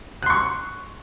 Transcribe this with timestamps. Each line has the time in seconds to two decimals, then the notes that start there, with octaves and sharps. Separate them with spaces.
0.23 F#6
0.26 C6
0.30 C#6